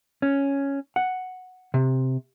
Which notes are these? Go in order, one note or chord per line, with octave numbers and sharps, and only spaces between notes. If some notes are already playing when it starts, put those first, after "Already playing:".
C#4
F#5
C3